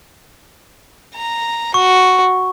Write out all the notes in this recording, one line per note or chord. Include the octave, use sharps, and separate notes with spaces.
A#5
F#4 C#6